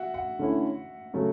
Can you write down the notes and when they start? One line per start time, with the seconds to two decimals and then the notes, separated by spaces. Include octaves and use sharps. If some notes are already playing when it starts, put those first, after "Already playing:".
Already playing: F#4 E5 F#5
0.14 F#5
0.39 D3 A3 C#4 E4
1.14 C#3 F#3 A3 C#4